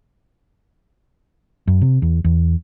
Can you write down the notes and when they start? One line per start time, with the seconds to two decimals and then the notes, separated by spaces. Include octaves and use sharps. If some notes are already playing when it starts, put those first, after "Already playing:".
1.67 F#2
1.82 C3
2.02 E2
2.24 E2